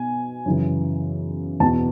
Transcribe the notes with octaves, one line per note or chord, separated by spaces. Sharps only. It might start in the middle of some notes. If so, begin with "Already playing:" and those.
Already playing: B2 G#5
F#2 C#3 E3
E2 B2 A5